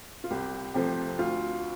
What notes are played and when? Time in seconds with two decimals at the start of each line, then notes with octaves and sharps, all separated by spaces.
0.24 F4
0.30 C2 G4
0.74 C3 F3 A3 C4 G4
1.19 D2 F4